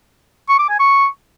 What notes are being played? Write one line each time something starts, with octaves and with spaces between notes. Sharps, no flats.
C#6
D6
G#5
C#6